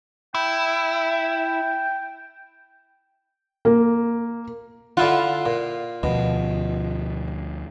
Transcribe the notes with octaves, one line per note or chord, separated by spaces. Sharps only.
E4 G5
A#3
D3 E4 F4 F#5
A#2
D2 B2 F3